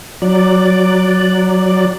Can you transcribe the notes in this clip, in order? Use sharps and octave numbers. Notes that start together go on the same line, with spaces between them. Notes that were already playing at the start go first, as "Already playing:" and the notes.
F#3 D5